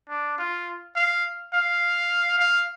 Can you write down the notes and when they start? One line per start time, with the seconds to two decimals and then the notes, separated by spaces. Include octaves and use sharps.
0.09 D4
0.39 F4
0.96 F5
1.54 F5
2.39 F5